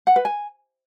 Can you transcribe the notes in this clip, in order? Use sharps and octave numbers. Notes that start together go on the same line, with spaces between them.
F#5
B4
G#5